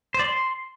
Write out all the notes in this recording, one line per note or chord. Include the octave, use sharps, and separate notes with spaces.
C5
D5
C6